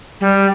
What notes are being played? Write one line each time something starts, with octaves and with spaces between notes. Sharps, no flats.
G3